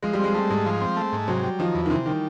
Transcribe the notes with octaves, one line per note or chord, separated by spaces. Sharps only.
F3 G#3
G3
G#3 C4
G3 A3
G#2 G#3
F3
C4
A3
G#2
C3 F#3
G3
D#3 F3
E2
D#3
C3 E3
D#3 G3